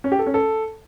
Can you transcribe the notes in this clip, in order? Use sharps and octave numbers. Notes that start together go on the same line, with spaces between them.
C#4
G4
A4
C#4
A4